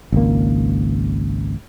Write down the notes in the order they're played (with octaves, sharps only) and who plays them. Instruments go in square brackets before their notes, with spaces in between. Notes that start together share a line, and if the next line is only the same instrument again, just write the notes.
[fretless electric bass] G#1 C#2 A#3